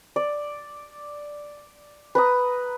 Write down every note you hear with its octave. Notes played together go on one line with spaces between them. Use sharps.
D5
B4 A#5 D#6